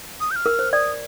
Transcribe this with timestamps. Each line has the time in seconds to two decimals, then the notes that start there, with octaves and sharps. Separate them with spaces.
0.21 D#6
0.31 G6
0.36 F6
0.46 A#4
0.59 C5
0.73 D5 D#6